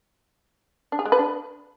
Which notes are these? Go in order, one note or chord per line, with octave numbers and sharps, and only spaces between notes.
D4
G#4
G#3
B4
D4